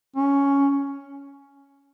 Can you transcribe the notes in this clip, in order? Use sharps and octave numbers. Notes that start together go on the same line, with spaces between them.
C#4